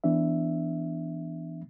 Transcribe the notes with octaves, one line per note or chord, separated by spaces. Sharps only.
E3 B3 D4 E5